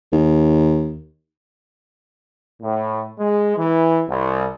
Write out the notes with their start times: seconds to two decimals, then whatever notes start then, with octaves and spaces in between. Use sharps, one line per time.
0.12 D#2
2.62 A2
3.19 G#3
3.57 E3
4.08 C2